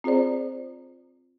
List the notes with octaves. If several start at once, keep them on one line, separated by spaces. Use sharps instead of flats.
C4 F4 G#4 C5 D5